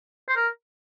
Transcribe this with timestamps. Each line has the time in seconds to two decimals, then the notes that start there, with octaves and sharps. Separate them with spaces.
0.28 C5
0.36 A#4